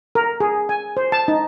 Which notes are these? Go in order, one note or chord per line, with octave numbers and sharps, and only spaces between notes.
A#4
G#4
G#5
C5
A5
D#4